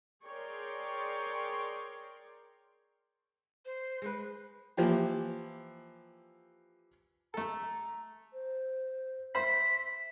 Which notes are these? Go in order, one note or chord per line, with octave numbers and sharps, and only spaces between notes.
G#4 A#4 C#5 D5 G5 C6
C5
G#3 B4
E3 F3 A#3 G4
A3 A4 A#5
C5
C5 E5 B5 B6